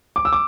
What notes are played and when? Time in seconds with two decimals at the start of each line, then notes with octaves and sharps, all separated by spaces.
0.16 D6
0.25 E6
0.33 D6